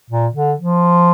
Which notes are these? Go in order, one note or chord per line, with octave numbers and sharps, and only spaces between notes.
A#2
D3
F3